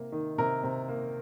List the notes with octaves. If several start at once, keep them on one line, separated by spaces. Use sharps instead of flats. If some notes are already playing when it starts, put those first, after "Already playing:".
Already playing: C3 A#3
D#3
C3 A#4
C3
A#3